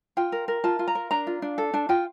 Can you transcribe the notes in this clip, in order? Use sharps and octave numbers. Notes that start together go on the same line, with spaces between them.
F4 G5
A#4
A#4
F4 A5
F4
A#5
A#4
D4 A#5
F4
D4
A4
D4 A5
F4 G5